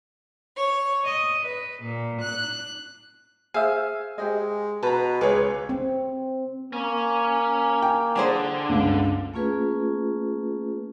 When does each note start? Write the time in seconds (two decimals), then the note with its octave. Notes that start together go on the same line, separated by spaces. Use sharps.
0.55 C#5
1.04 D#5
1.44 B4
1.81 A#2
2.20 F#6
3.54 G#4 C5 E5 F5 G#5 E6
4.18 G#3 G4 C5 D#5
4.83 B2 B4 A5 A#5
5.21 C#2 F4 G#4 B4 C#5 D6
5.69 C4
6.73 A#3 C#4
7.82 G5 G#5
8.16 D3 D4 G#4 C5
8.69 G1 C#2
9.34 A3 A#3 C#4 F4 G#4 B4